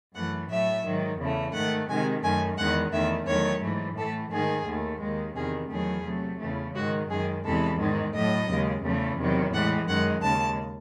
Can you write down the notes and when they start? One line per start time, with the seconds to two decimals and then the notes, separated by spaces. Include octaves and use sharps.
0.14 F#2 E3 A3 F#5
0.49 A2 F#3 A3 E5
0.84 G#2 D#3 F#3
1.18 E2 C#3 E3 A3
1.53 G#2 D#3 A3 F#5
1.88 C3 D#3 G#3 G#5
2.22 F#2 D#3 A3 G#5
2.57 E2 D#3 G#3 F#5
2.92 E2 D#3 A3 E5
3.26 E2 D#3 F#3 A3 C#5
3.61 G#2 E3 A3
3.96 A2 E3 A3 A4
4.31 G#2 D#3 A3 G#4
4.66 D#2 D#3 A3
5.00 D#2 D#3 G#3
5.35 E2 C3 D#3 G#4
5.70 E2 D#3 F#3 A3 G#4
6.05 C3 F#3 A3
6.39 E2 C#3 E3 A3
6.74 G#2 D#3 G#3 F#4
7.10 F#2 D#3 G#3 G#4
7.43 E2 C3 E3 G#3 A4
7.78 G#2 D#3 G#3
8.13 A2 F#3 A3 D#5
8.48 D#2 C#3 G#3
8.83 E2 C#3 E3 A3
9.17 E2 C3 D#3 F#3
9.52 A2 E3 G#3 F#5
9.87 F#2 D#3 G#3 F#5
10.21 D#2 C#3 G#3 A5